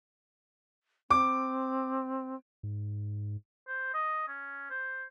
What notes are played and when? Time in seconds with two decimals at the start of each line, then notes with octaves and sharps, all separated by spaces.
1.11 C4 D6
2.63 G#2
3.68 C5
3.94 D#5
4.28 C#4
4.70 C5